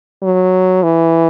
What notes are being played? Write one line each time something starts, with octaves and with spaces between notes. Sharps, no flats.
F#3
E3